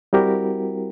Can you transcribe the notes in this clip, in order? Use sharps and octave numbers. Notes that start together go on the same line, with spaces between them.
G3 C4 E4 F#4 G4 A#4